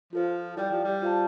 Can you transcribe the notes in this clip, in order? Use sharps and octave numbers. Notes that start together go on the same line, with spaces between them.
F3 F4 A4 C5
G3 E4 G4 D5 G5
F3
G3
F4 C5 F5 A5